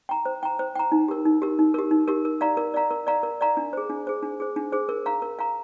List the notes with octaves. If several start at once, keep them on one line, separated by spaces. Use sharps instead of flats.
G5 A#5
C5
G5 A#5
C5
G5 A#5
D#4
G4 A#4
D#4
G4 A#4
D#4
G4 A#4
D#4
G4 A#4
A#4
D5 F5 A#5
A#4
D5 F5 A#5
A#4
D5 F5 A#5
A#4
D5 F5 A#5
D4
G#4 C5
D4
G#4 C5
D4
G#4 C5
D4
G#4 C5
A#4
F5 A#5
A#4
F5 A#5